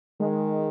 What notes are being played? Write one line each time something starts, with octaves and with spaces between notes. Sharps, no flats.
D#3 G#3